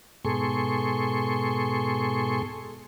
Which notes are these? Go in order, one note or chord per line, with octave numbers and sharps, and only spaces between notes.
G#2 B2 G#4 A4 C6 C#6